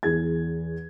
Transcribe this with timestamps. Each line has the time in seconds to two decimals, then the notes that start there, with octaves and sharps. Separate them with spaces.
0.03 E2 G#4 G#6